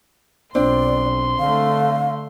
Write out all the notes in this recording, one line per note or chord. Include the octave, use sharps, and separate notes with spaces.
B1 C4 D4 F4 D5 C6
D3 A3 F5